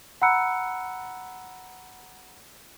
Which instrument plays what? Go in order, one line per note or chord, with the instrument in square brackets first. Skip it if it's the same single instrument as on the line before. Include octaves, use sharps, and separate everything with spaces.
[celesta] F#5 A#5 B5 E6 F#6 C#7